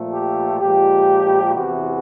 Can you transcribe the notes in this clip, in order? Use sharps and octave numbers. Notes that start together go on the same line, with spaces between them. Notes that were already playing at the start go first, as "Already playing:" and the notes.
Already playing: A#2 F3 A3
G4
A#2 F3 G#3 G4
E2 C3 E3 F#4